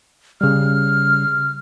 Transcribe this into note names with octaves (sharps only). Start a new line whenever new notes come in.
C#3 G3 F6